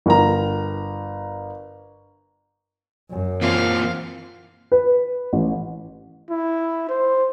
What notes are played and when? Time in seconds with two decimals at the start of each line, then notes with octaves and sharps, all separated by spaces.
0.06 G1 A#4 A#5
3.11 F#2
3.42 E3 A#3 C4 F4 F5
4.72 B4
5.33 A1
6.31 E4
6.89 C5